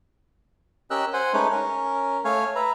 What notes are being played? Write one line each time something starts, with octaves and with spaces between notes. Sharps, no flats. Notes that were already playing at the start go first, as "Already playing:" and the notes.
C#4 G4 A#4 D#5 E6 F#6
C5 F#5 G#5
G#3 A3 C#4 D#4 B4 C#5
C#4 A#4
A3 C#5 F5 G#5
B4 E5 A#5